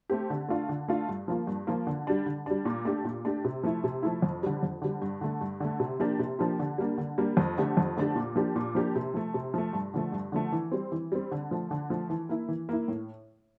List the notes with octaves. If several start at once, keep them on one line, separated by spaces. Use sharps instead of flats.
A3 C4 G4
D3
A3 D4 F4
D3
A3 D4 F4
G2
F3 A#3 F4
G2
F3 A#3 F4
D3
G3 D4
D3
G3 D4
A#2
A3 D4 G4
A#2
A3 D4 G4
C3
F3 A3 E4
C3
F3 A3 E4
F2
D3 G3
F2
D3 G3
G2
D3 A3
G2
D3 A3
C3
F3 A#3 D4 G4
C3
F3 A#3 D4 G4
D3
G3 A#3 D4
D3
G3 A#3 D4
F2
D3 A3 D4 G4
F2
D3 A3 D4 G4
A#2
F3 A#3 D4 G4
A#2
F3 A#3 D4 G4
C3
F3 A3
C3
F3 A3
G2
D3 F3 A3
G2
D3 F3 A3
E3
G3 C4
E3
G3 C4
D3
F3 A3
D3
F3 A3
E3
A#3 E4
E3
A#3 E4
A2